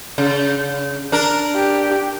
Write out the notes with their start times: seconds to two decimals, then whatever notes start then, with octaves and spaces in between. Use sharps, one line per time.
0.18 C#3
1.12 D4 A#4
1.55 G4